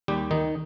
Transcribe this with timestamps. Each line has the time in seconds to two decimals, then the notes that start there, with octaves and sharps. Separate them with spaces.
0.08 D#2 G3 G4
0.31 D#3 D#4